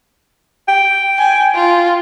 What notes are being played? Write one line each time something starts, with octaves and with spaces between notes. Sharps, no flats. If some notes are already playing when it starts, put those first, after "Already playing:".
G5
G#5
F4